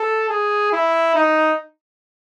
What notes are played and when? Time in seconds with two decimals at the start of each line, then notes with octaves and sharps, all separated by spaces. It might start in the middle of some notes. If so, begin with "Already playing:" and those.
Already playing: A4
0.30 G#4
0.72 E4
1.16 D#4